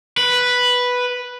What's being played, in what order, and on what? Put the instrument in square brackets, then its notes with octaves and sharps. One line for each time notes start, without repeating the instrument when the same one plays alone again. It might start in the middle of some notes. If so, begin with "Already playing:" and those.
[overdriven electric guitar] B4